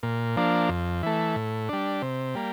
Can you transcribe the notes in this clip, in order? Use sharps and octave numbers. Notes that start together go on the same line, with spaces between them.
A#2
F3 A#3 D4
F2
E3 A3
A2
G3 D4
C3
G3 A#3